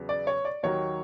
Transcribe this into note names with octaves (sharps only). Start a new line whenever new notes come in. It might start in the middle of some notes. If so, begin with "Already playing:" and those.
Already playing: E2 C#3 F#3 B3
D5
C#5
D5
D#2 D#3 F#3 A#3 C#5